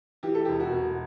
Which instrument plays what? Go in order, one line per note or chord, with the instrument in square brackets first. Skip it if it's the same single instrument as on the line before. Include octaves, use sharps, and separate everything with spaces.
[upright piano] E3 G4
A4
E1 G4
F#4
E1